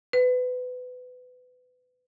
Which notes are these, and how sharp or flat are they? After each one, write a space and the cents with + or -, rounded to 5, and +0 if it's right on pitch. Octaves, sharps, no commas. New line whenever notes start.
B4 +25